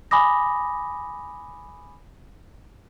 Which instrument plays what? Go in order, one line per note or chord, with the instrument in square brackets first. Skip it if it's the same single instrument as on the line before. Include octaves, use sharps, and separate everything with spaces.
[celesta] G#5 B5 D6 D#6 A#6